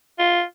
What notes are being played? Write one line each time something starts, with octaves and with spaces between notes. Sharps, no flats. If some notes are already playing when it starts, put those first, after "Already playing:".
F4